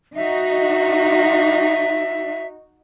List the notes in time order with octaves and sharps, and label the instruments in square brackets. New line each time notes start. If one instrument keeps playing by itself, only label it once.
[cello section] D#4 F#4 [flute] E5